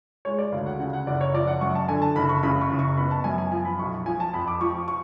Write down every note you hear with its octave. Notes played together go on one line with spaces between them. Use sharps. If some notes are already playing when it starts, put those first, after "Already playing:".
G#3 C#5
D5
D2 F5
F#5
C#3 F#5
F#5
F#1 D5
C#5
F3 D5
F#5
F#2 C#6
A5
D3 G#5
A5
F#1 B5
C#6
C#3 B5
C#6
F#1
C#6
B3 B5
A5
F#2 G#5
G#5
F3 G#5
B5
B1 C#6
F3 G#5
A5
F2 B5
D6
F3 C#6
C#6